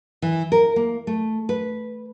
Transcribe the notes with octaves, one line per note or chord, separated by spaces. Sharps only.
E3
A#4
A#3
A3
B4